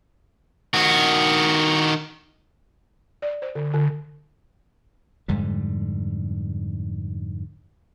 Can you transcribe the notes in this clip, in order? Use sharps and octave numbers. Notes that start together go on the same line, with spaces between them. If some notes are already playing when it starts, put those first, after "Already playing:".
D#3 F#4
D5
C5
D3
D3
F2 G#2 D3 G3